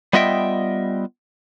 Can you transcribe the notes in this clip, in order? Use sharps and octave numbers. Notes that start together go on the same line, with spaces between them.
G3 B3 F4 D#5 E5 G5